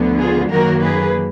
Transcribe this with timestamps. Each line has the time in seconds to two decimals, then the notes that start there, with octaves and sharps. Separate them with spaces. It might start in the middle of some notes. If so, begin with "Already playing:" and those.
Already playing: D2 D3 F3 B3
0.18 F4 G#4
0.50 F#2 D#3 F#3 A#3 F#4 A#4
0.82 G#4 B4